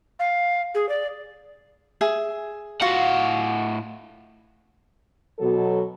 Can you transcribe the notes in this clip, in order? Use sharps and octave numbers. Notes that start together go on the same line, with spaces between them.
F5
G#4
D5
G#4 E5 G#5
A2 F4 F#4 F5 F#5
B2 F#3 A4